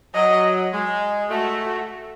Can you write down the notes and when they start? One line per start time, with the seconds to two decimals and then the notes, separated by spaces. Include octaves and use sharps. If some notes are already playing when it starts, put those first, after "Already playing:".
0.15 F#3 D#5
0.73 G#3
1.30 A3 F#4